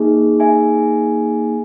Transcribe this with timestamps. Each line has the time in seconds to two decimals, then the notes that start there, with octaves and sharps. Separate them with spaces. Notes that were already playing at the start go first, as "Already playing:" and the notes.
Already playing: A#3 D#4 G#4
0.40 E5 G#5